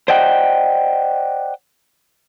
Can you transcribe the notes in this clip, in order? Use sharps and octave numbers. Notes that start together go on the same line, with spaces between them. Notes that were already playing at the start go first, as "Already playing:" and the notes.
C5 D5 D#5 F#5 G5